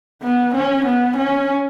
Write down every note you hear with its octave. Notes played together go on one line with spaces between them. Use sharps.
B3
C#4
B3
C#4